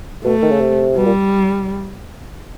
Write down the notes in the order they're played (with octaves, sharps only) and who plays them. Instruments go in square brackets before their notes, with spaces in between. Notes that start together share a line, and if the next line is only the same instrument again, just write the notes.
[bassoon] B2 [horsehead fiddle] A3
[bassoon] D#3
C#3
C3
[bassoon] B2 [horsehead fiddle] G3
[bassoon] A#2